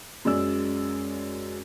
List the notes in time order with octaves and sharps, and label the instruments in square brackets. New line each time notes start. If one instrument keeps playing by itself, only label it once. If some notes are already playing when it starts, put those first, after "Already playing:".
[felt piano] F#2 G#3 D5 E6